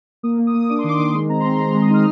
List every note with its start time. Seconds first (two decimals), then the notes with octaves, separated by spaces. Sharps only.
0.23 A#3 D#6
0.38 A#3
0.47 D#6
0.54 A#3
0.69 D4 D6
0.78 C6
0.84 D#3 D6
0.99 D#3
1.14 G#3 C6
1.29 C4 A#5
1.40 C6
1.45 C4 A#5
1.59 G#3 C6
1.74 G#3
1.82 D#6
1.89 D#4 F6